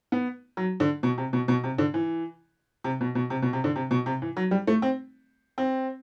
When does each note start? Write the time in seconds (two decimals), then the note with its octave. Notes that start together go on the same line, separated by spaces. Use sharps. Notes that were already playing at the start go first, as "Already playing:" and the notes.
0.12 B3
0.57 F#3
0.80 D3
1.03 B2
1.18 C3
1.33 B2
1.48 B2
1.64 C3
1.78 D3
1.94 E3
2.84 C3
3.01 B2
3.15 B2
3.30 C3
3.42 B2
3.53 C3
3.64 D3
3.76 C3
3.91 B2
4.06 C3
4.22 E3
4.37 F#3
4.51 G3
4.67 A3
4.82 C4
5.58 C4